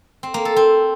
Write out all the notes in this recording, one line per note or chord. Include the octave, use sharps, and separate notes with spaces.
C4
A#3
A4
C4